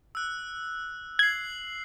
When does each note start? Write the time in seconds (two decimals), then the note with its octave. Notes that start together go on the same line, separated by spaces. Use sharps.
0.15 E6 F#6
1.19 G#6 C7 F#7